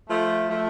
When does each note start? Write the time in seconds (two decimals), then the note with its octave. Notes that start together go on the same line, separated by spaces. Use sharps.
0.09 F3 A3
0.49 F3 A3